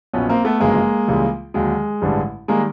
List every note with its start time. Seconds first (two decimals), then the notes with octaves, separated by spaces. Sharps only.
0.13 A#1 A#2 F#3 B3 C#4
0.29 A#3 C4
0.45 A3 B3
0.60 G1 F#2 C#3 F3 G#3 A#3
1.08 C#2 C#3 E3 G3
1.54 D#2 D3 F#3 G#3
2.01 A1 G2 D3 G3
2.48 D#3 G3 G#3 A#3